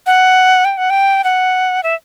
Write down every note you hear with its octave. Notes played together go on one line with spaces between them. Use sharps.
F#5
G5
F#5
G5
F#5
E5